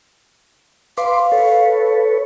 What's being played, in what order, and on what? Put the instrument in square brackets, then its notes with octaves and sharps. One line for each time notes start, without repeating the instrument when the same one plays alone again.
[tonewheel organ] B4 C6 D6 [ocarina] F5
[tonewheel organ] A4 B4 C#5